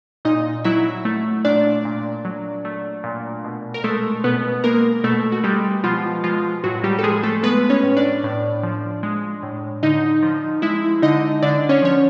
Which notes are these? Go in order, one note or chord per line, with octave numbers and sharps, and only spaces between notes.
A#2 D#4 D#5
F#3 E4 E5
A3
A#2 D4 D5
A#2
F#3
A3
A#2
B2
A#4
G#3 A3 A4
B2 B3 B4
G#3 A#3 A#4
B2 A3 A4
F#4
G3 G#3 G4
B2 F3 F4
F3 G#3 F4
A2 F#3 F#4
G3 G4
A4
F3 G#3 G#4
A3 A4
G#3 B3 B4
C#4 C#5
A2
D4 D5
A2
F3
G#3
A2
D3 D#4 D#5
F3
G#3 E4 E5
D3 D#4 D#5
D3 D4 D5
C#4 C#5
F3 C#5